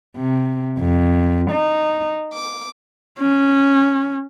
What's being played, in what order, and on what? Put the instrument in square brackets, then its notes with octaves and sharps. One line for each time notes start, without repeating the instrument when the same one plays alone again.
[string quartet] C3
F2
D#4
D6
[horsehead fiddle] C#4